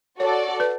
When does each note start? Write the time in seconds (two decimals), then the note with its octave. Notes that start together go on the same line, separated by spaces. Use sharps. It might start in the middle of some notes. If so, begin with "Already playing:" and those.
0.20 F#4 A4 C#5 D5
0.60 B4